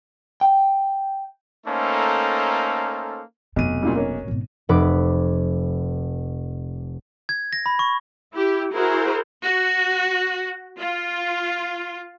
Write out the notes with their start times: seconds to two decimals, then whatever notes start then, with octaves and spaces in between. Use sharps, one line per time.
0.41 G5
1.67 A3 A#3 C#4 D#4 A4 C5
3.56 F1 B1 C3 D#7
3.82 A#2 C#3 G3
3.95 A#3 C#4
4.28 G#1 B2
4.69 F1 B4 D6
7.29 G#6
7.53 A#6
7.66 B5
7.79 C#6
8.34 E4 G4
8.73 E4 F#4 G#4 A#4 C5
9.43 F#4
10.80 F4